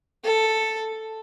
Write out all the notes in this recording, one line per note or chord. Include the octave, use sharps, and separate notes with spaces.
A4